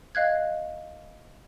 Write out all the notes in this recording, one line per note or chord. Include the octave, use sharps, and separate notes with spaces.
D#5 F5 F#6 G#6